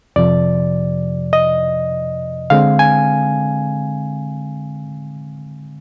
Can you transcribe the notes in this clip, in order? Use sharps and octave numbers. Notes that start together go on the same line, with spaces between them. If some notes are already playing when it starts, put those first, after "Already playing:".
F2 C3 F3 D5
D#5
D3 G#3 C4 F5
G#5